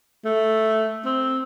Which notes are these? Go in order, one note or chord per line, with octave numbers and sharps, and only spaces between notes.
A3
C4